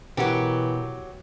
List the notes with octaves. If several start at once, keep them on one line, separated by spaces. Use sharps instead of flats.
B2 E3 F#3 G4 A#4 F#5